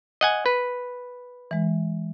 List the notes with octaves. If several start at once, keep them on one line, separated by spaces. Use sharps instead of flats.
D#5 F#5 G#5
B4
E3 G#3